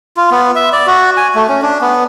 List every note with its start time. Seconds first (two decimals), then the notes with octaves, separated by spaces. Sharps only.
0.17 F4
0.31 B3
0.56 E5
0.73 D5
0.87 F#4
1.17 G#5
1.35 A3
1.49 C#4
1.62 D4
1.81 B3